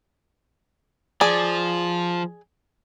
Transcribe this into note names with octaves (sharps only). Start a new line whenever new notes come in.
F3 G#4 D5